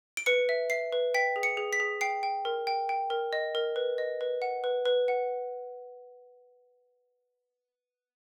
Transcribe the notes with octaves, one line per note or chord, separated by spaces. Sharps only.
D7
B4 C#7
E5
E5 C7
B4
G5 B6
G#4
C#7
G#4
B6
G#4
G5 C7
G5
A#4
G5
G5
A#4
D#5
A#4
B4
D#5
B4
F#5
B4
B4
F#5